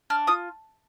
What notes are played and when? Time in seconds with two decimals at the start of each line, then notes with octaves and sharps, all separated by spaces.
0.10 D4 F6
0.27 F4 D#6